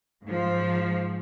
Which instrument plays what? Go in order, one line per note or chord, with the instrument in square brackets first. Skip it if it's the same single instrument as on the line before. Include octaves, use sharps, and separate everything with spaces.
[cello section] G#2 F3